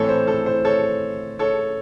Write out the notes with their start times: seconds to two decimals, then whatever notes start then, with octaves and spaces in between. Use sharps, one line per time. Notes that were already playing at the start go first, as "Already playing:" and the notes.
Already playing: A2 E3 C4 A4 C#5
0.09 C5
0.27 A4
0.46 C5
0.65 A4 C#5
1.39 A4 C#5